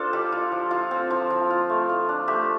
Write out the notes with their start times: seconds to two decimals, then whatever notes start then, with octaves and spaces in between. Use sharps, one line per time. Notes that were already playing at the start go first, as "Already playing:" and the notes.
Already playing: D4 F4 A4 C5
0.13 G3
0.32 F4
0.52 F3
0.71 F4
0.91 C4
1.10 F3
1.30 F3
1.50 F4
1.70 A3
1.89 F4
2.09 D4
2.28 A3 G4